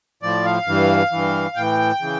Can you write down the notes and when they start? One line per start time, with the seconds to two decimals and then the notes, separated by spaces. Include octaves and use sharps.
0.23 A2 F3 D5
0.45 F5
0.67 G2 E3
1.12 G2 E3
1.56 A2 E3 G5
2.01 C#3 E3